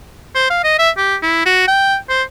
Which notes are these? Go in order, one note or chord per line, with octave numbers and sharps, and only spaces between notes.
C5
F5
D#5
E5
G4
E4
F#4
G5
C5